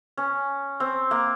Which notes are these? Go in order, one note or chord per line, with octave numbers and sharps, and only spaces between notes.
C#4
C4
A#3